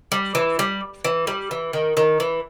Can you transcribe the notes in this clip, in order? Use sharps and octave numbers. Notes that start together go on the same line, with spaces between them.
G3
E3
G3
E3
G3
E3
D#3
D#3
E3